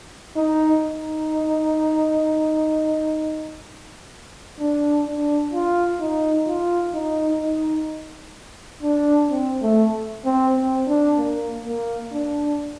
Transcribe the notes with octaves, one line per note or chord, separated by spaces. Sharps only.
D#4
D#4
D4
D4
F4
D#4
F4
D#4
D#4
D4
C4
A3
C4
C4
D4
A#3
A#3
D4